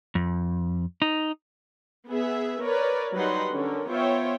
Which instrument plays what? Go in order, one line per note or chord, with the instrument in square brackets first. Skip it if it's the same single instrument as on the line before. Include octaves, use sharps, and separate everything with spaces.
[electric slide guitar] F2
D#4
[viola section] B3 G#4 E5
A#4 B4 C#5 D5
F#3 G3 D#4 B4 F#5 C6
D3 C#4 A#4
B3 F4 C5 C#5 E5 G5